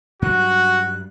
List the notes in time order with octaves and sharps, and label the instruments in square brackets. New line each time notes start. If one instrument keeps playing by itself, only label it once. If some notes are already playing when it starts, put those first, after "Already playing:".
[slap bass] G2 F#3 G3 [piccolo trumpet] F#4 [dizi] F#6